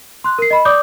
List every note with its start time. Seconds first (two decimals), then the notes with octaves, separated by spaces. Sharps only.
0.24 C6 F#6
0.38 A#4 C7
0.50 D#5 B5
0.65 D5 D6 D#6 G6